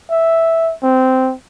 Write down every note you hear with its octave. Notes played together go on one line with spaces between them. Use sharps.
E5
C4